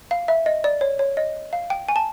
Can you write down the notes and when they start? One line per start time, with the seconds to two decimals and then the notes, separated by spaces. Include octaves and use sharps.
0.11 F5
0.28 E5
0.46 D#5
0.64 D5
0.81 C#5
0.99 C#5
1.17 D#5
1.53 F5
1.70 G5
1.89 G#5
1.96 A5